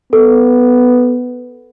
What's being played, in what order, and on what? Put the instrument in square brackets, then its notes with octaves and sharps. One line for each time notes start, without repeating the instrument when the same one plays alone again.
[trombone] B3 [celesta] A4